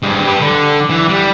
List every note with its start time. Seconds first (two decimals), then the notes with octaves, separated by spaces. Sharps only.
0.02 G2 G#3
0.24 G4 B4
0.41 D3
0.90 E3
1.09 G3